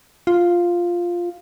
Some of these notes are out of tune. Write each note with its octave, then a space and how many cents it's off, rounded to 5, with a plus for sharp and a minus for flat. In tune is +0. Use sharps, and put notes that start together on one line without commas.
F4 +0